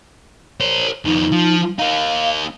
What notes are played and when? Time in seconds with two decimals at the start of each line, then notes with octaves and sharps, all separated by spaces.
0.60 A#4 C5 C#5
1.05 F2 B3 D#4
1.32 F3
1.79 A#3 D#4 F5